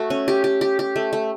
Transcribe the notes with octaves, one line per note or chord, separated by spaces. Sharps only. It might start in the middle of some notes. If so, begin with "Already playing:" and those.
Already playing: A3 F#4
C#4
G4
G4
G4
G4
A3
A3